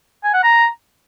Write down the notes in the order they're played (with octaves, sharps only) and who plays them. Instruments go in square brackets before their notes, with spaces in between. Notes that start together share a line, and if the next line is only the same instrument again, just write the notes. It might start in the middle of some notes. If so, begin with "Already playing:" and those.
[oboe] G#5
F#5
A#5